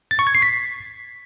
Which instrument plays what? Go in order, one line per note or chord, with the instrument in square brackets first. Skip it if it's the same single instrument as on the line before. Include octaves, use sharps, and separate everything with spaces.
[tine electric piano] A6
C#6
G#6
C7
B6